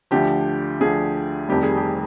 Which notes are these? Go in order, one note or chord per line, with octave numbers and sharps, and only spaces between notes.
D2 D3 F3 G4
D2 D3 F3 G#4
F1 F2 D#3 G3 G4
G#4
G4